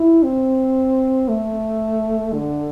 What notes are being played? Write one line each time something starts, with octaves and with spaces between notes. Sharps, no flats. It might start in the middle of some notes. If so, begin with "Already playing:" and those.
Already playing: E4
C4
A3
D3